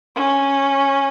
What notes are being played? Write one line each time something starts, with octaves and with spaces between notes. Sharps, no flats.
C#4